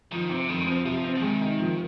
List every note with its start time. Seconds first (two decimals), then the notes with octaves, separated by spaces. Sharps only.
0.12 D#3 F3
0.29 C3 C4
0.49 F2 D#3
0.60 G#3
0.67 F3 C4
0.85 C3 F3
1.04 C4
1.15 F3
1.22 D#3 G#3
1.41 D#4
1.59 F3